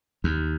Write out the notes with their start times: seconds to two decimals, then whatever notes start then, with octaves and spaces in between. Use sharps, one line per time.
0.24 D#2